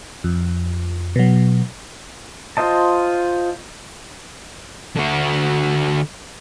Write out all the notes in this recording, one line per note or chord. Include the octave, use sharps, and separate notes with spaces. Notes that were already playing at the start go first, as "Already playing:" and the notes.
F2
B2 F#3
F4 C5 D#5 A5
D3 F#4